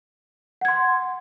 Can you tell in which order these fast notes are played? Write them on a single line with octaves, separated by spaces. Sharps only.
F#5 G#6 C6